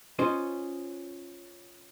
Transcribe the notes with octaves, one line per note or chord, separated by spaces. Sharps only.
C#4 F4 C5 D#5